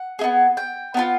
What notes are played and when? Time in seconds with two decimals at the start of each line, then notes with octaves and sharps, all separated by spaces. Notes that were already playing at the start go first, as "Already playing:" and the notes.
Already playing: F#5
0.19 B3 D#4 G#4
0.57 G5
0.94 B3 D4 F4